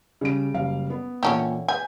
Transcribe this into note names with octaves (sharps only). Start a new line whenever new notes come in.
C#3 G3 D7
F#1 G3 F5
B3
A#2 D3 E3 C#4 G4 A4
B4 G#5 G6